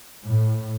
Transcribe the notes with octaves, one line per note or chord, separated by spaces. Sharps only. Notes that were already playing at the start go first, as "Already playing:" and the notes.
A2